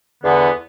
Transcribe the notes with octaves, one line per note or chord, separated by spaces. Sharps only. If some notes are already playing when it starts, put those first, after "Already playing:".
E2 D3 B3